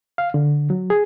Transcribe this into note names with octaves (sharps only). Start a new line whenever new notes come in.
F5
D3
F#3
G#4